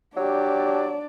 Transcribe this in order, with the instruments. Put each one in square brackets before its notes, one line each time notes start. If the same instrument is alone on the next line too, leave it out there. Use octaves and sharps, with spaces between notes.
[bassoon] F#3 [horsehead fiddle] D4 D5 [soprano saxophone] G4